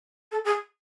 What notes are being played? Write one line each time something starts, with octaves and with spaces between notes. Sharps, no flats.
A4
G#4